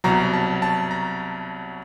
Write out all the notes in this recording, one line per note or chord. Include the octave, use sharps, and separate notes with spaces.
C2 B2 F#3 A#5
A5
A5
A#5